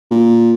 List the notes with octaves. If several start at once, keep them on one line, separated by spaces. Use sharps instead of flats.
A#2